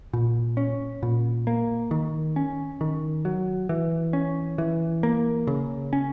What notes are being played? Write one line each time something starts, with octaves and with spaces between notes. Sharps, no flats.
A#2
C#4
A#2
A#3
D#3
C#4
D#3
F#3
E3
C#4
E3
A#3
C#3
C#4